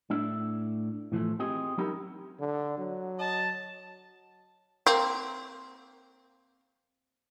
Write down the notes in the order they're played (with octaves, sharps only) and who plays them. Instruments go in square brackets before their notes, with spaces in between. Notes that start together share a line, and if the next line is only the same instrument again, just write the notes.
[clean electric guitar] A2 D4 E5
A2 E3 F3 A3
C4 G4 G#4 D#5
F#3 C#4 D#4 E4 G4 A#4
[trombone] D3
F#3
[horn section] D#5 A5
[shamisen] A#3 C4